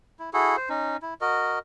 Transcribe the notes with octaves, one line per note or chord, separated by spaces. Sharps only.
E4
E4 F#4 G#4 A4
C5
C#4 D#4
E4
F#4 A#4 D#5